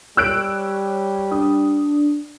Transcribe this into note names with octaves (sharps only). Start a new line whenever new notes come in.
G3 C#5 E6 F#6 D7
D4 D#6